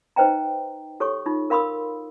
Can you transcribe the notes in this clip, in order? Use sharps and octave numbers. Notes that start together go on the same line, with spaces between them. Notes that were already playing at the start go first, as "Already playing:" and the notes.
D#4 B4 C5 D#5 G5 A#5
G4 A4 C#5 C#6
D#4 F4
A#4 F5 B5 C6 D#6 E6